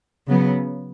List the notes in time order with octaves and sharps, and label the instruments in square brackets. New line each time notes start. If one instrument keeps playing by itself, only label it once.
[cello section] C#3 F#3 B3